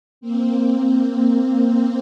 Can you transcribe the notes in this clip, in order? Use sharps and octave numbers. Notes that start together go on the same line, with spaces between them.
A#3 C4
A#3 C4